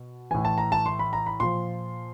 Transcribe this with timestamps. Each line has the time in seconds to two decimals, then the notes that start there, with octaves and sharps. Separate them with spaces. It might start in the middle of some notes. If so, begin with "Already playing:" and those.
Already playing: B2
0.31 A2 E3 G#5
0.45 A5
0.58 A#5
0.72 A5
0.86 C6
0.99 B5
1.13 A#5
1.26 B5
1.40 A#2 F3 C6